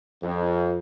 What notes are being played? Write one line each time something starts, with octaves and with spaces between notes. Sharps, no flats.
F2